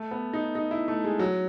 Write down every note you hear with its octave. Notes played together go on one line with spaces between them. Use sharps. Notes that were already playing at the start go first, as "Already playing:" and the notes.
Already playing: A3
B3
D#4
D#4
E4
A3
G#3
F#3